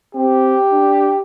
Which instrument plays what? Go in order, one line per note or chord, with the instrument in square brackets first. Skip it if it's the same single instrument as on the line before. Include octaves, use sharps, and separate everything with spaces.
[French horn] C4 [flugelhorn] G4
[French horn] D4